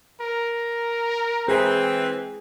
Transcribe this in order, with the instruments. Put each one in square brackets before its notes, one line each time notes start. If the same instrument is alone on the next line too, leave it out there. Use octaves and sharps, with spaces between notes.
[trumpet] A#4
[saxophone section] E3 C4 [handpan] G#4